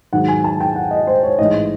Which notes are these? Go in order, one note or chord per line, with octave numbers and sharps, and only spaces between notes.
G#2 D#3 F#3 F#5
G#5
A5
G5
F#5
D#5
C5
C#5
A1 G#2 E3 D#5